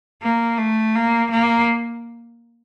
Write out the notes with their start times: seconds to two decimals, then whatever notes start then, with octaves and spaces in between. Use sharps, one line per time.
0.22 A#3
0.58 A3
0.95 A#3
1.31 A#3